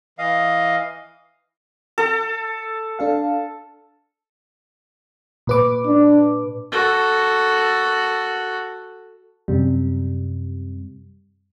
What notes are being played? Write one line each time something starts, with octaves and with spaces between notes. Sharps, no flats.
E3 D#5 F5
A4
D4 A4 F5
A#2 B4 D6
D4
F#4 A4
F#2 C3 G3